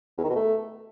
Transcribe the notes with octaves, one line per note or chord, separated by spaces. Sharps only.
E2
D#3
B2
A3